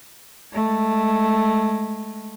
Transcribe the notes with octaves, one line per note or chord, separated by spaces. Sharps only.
G#3 A3